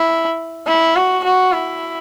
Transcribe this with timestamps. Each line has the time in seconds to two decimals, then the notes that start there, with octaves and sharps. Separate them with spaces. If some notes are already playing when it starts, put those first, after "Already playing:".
Already playing: E4
0.67 E4
0.96 F#4
1.24 F#4
1.52 E4